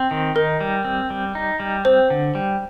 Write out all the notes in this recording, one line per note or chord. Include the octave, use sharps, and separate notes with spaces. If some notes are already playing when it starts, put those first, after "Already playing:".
Already playing: C4
D#3
D#4 A#4
G3
C4
G3
D#4
G3
C4 C5
D3
G3